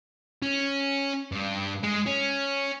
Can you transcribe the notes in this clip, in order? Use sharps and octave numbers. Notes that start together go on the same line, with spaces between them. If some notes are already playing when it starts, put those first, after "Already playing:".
C#4
G2
G#3
C#4